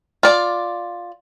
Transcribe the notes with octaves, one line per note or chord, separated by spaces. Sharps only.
F4 D5